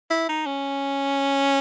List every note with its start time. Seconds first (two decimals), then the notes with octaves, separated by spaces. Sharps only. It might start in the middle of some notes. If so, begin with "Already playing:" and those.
0.10 E4
0.29 D#4
0.46 C#4